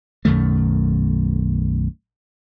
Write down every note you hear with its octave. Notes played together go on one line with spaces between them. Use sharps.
B1 F#2 D#3 A3